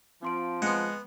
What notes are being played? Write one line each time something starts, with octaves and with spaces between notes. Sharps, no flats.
F3 C4 C6 D7
G#3 B3 F#5